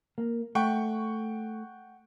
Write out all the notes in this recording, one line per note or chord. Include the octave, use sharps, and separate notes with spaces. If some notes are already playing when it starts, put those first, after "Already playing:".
A#3
A3 F#5 G5 C#6